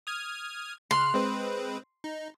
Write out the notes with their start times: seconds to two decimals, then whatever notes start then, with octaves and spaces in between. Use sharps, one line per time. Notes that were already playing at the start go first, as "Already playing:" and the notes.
0.07 D#6 F6 G#6
0.91 C#2 C6 F6 F#6
1.14 G#3 C4 B4
2.04 D#4